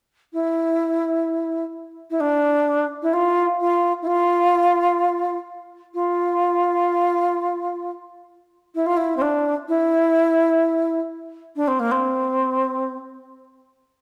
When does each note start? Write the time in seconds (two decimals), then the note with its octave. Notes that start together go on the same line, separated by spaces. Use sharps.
0.33 E4
2.10 E4
2.20 D4
3.02 E4
3.13 F4
3.60 F4
4.02 E4
4.07 F4
5.94 F4
8.75 E4
8.86 F4
8.97 E4
9.16 C4
9.21 D4
9.68 E4
11.56 D4
11.67 C4
11.79 A#3
11.91 C4